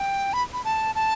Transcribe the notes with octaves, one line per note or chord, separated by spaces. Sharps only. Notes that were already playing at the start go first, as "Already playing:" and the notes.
Already playing: G5
B5
B5
A5
A5